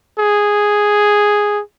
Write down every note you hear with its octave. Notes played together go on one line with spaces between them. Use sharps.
G#4